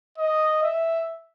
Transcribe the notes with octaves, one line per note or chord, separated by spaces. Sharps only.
D#5
E5